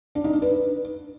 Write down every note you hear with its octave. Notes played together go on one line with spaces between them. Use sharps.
D4
D#4
D4
B4